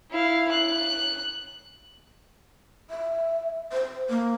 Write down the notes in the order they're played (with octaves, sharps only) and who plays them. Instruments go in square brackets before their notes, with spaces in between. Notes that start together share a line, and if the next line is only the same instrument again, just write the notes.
[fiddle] E4 F5
F#6
[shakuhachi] E5
C5
A#3